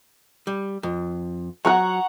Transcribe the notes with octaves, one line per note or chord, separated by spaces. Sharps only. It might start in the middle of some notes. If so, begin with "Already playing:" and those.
G3
F2
F#3 F#5 A#5 C#6